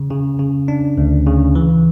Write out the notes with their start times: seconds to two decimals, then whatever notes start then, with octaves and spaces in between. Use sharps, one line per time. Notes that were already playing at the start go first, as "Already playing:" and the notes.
Already playing: C#3
0.10 C#3
0.39 C#3
0.68 D4
0.98 D2
1.26 C#3
1.55 E3